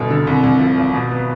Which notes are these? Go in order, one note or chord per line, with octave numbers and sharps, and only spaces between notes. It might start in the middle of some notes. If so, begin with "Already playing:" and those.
Already playing: G1 B2
D3
C2
C2
F3
G#1
B2
B3